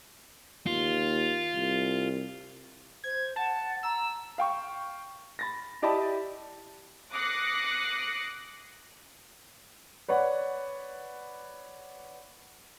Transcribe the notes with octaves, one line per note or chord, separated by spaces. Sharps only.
D#2 F4
C2
C5 G#6
F#5 A5
A#5 E6
F5 G5 C#6
B5 A6 A#6
E4 G4 D5 D#5 A5 B5
D6 D#6 F#6 A#6 C7 C#7
B4 C#5 D5 F#5